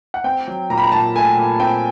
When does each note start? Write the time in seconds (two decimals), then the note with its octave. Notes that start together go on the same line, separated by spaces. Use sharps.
0.14 F#5
0.24 C4 G5
0.47 F#3
0.70 A#2 A#5
0.78 B5
0.83 A#5
0.92 A#2 A5
1.16 A3 G#5
1.37 A#2
1.60 C4 G5